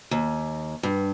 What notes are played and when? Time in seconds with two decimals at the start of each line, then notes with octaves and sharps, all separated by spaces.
0.11 D#2
0.83 G2